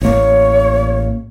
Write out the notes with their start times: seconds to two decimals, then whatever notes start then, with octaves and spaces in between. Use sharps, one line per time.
0.01 A1 A#3 C#5